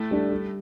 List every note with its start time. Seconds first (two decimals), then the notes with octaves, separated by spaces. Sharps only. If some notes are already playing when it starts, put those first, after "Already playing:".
Already playing: A2 A3
0.11 G3 D4 A4
0.32 G3